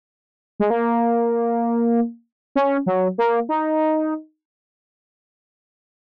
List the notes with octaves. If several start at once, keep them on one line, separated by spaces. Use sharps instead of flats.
G#3
A#3
C#4
F#3
A#3
D#4